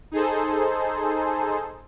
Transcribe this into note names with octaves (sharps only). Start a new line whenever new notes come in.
D#4 G#4 A4 C5